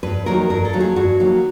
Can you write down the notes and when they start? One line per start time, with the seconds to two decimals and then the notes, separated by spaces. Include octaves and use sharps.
0.03 G2 B4
0.26 D#3 F#3 A#3 A#4
0.50 G2 A#4
0.65 A4
0.73 D#3 F#3 A#3
0.80 G#4
0.96 G2 F#4
1.20 D#3 F#3 A#3